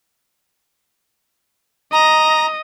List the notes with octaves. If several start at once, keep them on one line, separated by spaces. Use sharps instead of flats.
D#5 A#5